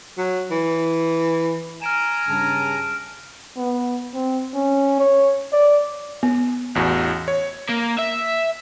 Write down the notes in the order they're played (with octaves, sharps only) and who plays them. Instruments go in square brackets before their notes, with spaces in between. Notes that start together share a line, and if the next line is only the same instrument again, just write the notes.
[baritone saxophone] F#3
E3
[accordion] G#5 A#5 [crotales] F6 D7 E7
[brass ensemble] G2 C#3 A5
[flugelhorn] B3
C4
C#4
C#5
D5
[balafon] B3
[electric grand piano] A1 E2 F#4
C#5
[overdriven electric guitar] A#3
E5